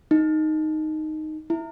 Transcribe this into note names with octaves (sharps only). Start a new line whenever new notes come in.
D#4
E4